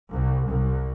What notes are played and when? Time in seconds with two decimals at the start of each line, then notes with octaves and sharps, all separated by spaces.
0.12 C2
0.48 C2